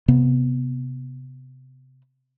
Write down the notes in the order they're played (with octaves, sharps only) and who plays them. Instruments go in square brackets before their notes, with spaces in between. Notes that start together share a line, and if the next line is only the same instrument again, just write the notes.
[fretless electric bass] C3 B3